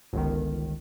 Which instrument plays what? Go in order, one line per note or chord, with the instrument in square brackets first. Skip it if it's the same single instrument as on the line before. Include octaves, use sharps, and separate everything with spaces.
[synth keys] G1 C#2 D#3